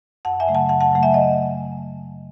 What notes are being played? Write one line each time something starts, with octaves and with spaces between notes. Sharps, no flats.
F#2 F#5 A5
E5 G#5
C#3 F#3 A3
F#5 A5
F#2 F#5 A5
F#5 A5
C#3 F#3 A3 F#5
E5 G#5
D#5 F#5